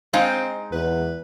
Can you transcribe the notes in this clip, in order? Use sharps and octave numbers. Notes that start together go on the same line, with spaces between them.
G#3 C4 D#4 F5
E2 B4